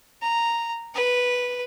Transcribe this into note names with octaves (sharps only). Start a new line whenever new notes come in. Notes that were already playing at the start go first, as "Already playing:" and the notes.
A#5
B4